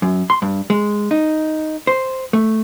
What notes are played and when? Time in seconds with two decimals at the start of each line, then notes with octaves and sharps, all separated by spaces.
0.02 F#2
0.30 C6
0.42 G2
0.70 G#3
1.11 D#4
1.87 C5
2.33 A3